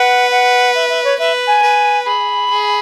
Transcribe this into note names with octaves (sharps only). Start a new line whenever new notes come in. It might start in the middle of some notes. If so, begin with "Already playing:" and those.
Already playing: B4 F#5
F#5
E5
E5
C#5
B4 E5
G#5
B4
G#4 B5
G#4